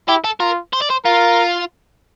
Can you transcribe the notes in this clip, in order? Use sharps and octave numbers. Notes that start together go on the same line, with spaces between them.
E4 G4
A4
F4 A#4
C5
D5
C5
F4 A#4